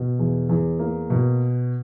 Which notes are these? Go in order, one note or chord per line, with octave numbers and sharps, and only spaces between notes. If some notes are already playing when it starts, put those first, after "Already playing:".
Already playing: B2
E2
E2
A#3
B2